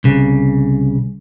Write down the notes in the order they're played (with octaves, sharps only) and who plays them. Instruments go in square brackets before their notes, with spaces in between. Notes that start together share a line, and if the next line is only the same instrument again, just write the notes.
[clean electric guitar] C2 C#3